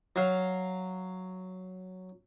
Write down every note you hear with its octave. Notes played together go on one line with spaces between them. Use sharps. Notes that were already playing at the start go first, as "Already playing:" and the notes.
F#3 F5